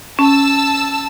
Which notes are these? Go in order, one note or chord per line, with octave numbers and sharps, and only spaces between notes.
C#4 A5 E6